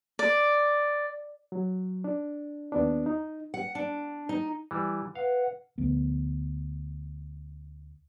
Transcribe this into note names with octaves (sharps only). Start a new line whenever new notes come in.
D5
F#3
D4
D#2 B3 D4
D#4
F#5
D4
D#4
E3 G3
B4 F5 F#5
D2 F3 B3